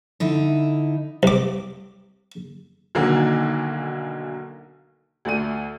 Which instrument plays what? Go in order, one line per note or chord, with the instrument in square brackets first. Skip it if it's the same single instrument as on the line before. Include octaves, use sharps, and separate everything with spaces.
[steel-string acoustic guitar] D3 D#4 E4
[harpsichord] C2 D6
[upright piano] B1 D3 D#3 F#3 A#3
D2 A3 D5 D#7